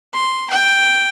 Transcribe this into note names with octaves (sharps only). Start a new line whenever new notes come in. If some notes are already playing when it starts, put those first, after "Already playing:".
C6
G5